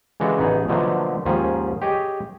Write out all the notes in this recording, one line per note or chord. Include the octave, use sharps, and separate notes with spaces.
C#3 E3 G#3 D4 F#4 A4
A1 B3 D#4 G#4
B2 D3 F3 F#3 A3 A#3
D#2 G#2 F3 C#4 G#4
G4 G#4 C#5 D#5